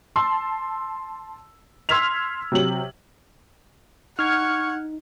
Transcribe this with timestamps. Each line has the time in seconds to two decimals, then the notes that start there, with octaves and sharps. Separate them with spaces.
0.16 A5 C6 E6
1.89 C6 E6 F6 G#6 B6 F7
2.52 C3 F#3 F#7
4.19 D#4 F#5 C#6 F6 G#6